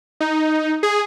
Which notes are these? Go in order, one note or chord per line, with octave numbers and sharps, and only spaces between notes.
D#4
G#4